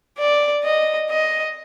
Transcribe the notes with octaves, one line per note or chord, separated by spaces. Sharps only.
D5
D#5
D#5